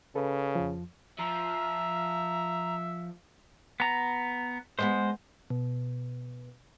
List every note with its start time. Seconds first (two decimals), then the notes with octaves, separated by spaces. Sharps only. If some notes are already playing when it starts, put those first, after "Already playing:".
0.15 C#3 A4 B4
0.55 F2 F3
1.19 F3 E5 A#5
3.80 B3 A#5
4.79 G#3 A#3 B3 C5
5.50 B2